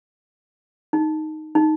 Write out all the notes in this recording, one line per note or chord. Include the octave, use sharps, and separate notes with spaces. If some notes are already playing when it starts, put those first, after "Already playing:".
D#4
D#4